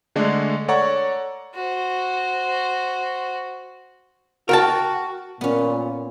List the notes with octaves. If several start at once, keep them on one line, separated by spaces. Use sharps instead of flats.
D3 G#3 A3 D4
A4 C#5 D5 F#5 A#5 C#6
F#4 C5
F#4 A#4 G5 A5
A#2 B3 C#4